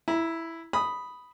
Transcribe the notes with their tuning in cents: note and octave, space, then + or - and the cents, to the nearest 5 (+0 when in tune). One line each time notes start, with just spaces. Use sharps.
E4 +0 A#5 +40
B5 +0 D#6 +0